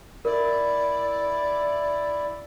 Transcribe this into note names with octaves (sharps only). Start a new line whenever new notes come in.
E4 A#4 D5